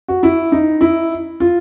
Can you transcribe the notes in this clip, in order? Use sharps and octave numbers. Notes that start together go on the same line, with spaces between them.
F#4
E4
D#4
E4
F4